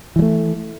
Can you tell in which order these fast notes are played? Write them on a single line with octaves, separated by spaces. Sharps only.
E3 F#3 A3